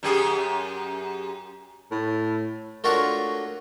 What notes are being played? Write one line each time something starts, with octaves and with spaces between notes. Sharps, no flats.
F#2 G4 G#4
A2
A3 D4 F4 F#4 A#4 C#5